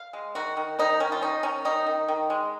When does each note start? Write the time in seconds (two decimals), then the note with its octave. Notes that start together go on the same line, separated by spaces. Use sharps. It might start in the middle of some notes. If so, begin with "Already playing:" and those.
Already playing: F5
0.13 G#3
0.35 D#3 F#4
0.57 D#3
0.79 D#3 D#4
1.00 D#3 C#4
1.12 F4
1.21 C#4 D#4
1.43 D#3 C#4
1.65 D#3 D#4
1.87 D#3
2.08 D#3
2.30 G#3